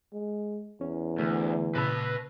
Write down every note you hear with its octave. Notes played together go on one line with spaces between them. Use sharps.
G#3
E2 C#4 C#5
D2 D3 E3 A3
A#2 C#3 B4 A5 E6